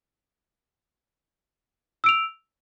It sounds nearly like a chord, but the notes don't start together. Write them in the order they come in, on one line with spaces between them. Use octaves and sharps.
E6 D7 F7